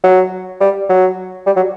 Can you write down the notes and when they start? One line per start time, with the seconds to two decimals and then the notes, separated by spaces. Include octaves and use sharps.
0.04 F#3
0.61 G3
0.89 F#3
1.46 G3
1.56 F#3